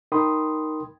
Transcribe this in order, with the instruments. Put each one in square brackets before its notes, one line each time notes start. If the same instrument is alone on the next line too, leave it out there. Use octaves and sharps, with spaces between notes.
[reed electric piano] D#4 A#4 G5 B5 C6 D#6